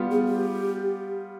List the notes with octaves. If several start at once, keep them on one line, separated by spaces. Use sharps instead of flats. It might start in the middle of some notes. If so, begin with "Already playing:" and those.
Already playing: G3 B3 F4
G#4
G4